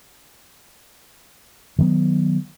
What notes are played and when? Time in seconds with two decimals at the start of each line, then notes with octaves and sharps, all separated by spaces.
1.79 D#3 F#3 A3 B3